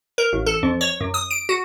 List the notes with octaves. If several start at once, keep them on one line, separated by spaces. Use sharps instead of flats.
A#4
A1
A4
F2
C#5
F#2
D#6
D7
F#4